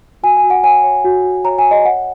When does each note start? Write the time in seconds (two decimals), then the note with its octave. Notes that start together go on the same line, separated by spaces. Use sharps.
0.23 F#4 G#5
0.37 G#5
0.44 F#4
0.50 F#5
0.64 C#5 G#5
0.83 C#5
1.04 F#4
1.24 F#4
1.45 C#5 A#5
1.58 G#5
1.65 C#5
1.71 D#5
1.85 C#5 F#5